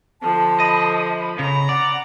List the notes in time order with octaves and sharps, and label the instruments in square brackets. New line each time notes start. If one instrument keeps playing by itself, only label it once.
[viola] D3 F3 [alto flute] A5
[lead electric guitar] D#5 [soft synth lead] B5
[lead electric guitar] C#3 [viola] A#5
[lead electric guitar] D5 [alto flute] F#5